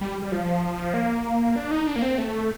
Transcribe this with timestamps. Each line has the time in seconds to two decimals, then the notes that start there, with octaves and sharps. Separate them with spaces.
0.01 G3
0.22 G3
0.32 F3
0.94 A#3
1.56 D4
1.71 D#4
1.87 D4
1.96 A#3
2.02 C4
2.18 A3